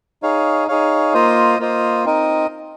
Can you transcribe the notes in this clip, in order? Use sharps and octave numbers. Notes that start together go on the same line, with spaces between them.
D#4 G#4 C#5 F5
D#4 G#4 C#5 F5
A#3 F4 C5 D#5
A#3 F4 C5 D#5
C4 D#4 A#4 D#5